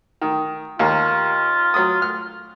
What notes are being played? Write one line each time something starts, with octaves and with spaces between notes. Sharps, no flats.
D#3
D#2 A#3 F4
F#3 D#6
F6